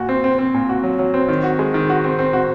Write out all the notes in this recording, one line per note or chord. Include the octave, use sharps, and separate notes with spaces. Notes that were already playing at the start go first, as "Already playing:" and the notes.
Already playing: A#2 F#4
C4
C4
C4
A#2
F#4
F#3
F#3
C4
D#3
F#4
G#3
D#3
F#4
C4
C4
F#4